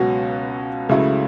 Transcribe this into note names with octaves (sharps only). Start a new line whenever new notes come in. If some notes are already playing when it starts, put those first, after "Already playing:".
Already playing: C#2 B2 F#3 C#4 F#4
C#2 C#3 F#3 A3 E4